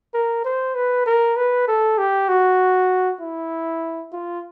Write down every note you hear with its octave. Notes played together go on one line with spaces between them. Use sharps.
A#4
C5
B4
A#4
B4
A4
G4
F#4
E4
F4